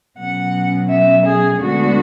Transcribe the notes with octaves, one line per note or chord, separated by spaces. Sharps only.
B2 F#3 C#4 F#5
E5
G#4
D2 D3 G#3 B3 D4 F#4